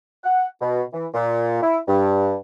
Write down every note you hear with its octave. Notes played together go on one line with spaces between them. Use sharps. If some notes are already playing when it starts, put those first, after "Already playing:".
F#5
B2
E3
A#2
E4
G2